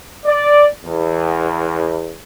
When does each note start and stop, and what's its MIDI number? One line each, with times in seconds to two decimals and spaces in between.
0.25 0.65 74
0.85 2.18 40